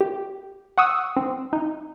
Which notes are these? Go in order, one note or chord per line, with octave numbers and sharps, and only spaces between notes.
G4
F#5 C#6 D#6 E6
C4
D#4